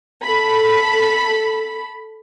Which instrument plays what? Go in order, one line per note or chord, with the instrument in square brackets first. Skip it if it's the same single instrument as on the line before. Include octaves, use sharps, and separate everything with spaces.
[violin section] A4 B5